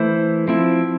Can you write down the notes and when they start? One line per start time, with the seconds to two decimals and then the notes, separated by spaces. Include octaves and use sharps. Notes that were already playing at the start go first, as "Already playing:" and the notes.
Already playing: E3 A3 E4 C5
0.48 F3 C4 E4